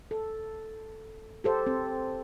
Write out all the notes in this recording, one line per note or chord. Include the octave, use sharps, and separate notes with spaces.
A4
G4 A4 C5
C4